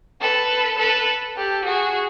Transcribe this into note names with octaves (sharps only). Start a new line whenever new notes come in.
A4 B4
A4 B4
G4 A4
F#4 G#4